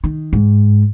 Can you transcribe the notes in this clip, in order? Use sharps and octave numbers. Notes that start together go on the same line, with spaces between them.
D#3
G#2